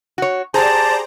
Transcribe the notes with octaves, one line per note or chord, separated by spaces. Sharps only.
F#4 C#5
G4 G#4 C5 D5 A5 A#5